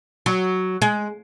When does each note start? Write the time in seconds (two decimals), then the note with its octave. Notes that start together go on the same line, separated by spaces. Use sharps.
0.26 F#3
0.82 G#3